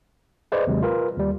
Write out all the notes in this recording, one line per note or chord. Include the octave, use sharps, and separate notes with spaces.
G#4 B4 C5 D5 D#5
D#2 C3 F#3 G#3
F4 A#4 B4
D#2 G3